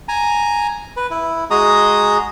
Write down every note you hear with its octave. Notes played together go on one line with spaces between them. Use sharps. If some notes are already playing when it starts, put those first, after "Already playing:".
G#5 A#5
B4
E4
G#3 F#4 G#4 D#5 A#5 D#6